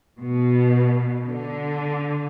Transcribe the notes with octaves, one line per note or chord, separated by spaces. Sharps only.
B2
D3